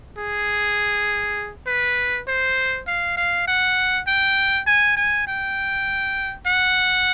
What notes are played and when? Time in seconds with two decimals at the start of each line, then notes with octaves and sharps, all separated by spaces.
0.17 G#4
1.67 B4
2.27 C5
2.87 F5
3.17 F5
3.47 F#5
4.07 G5
4.67 G#5
4.96 G#5
5.27 G5
6.46 F#5